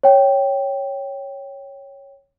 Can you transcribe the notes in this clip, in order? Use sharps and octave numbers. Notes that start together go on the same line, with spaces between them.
C#5 G5